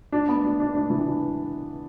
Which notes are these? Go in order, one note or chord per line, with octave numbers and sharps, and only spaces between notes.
D4
B3
D4
D4
D4
E3
D4